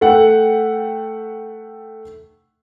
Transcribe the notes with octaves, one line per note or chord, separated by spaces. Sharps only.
A3 A4 F#5 G5